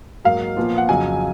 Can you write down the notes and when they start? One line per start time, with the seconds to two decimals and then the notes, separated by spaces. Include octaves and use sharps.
0.24 G#2 F#3 A#3 D#4 A#4 F5
0.57 A#2 F3 B3 F4
0.78 F#5
0.89 F2 C#3 F#3 G#5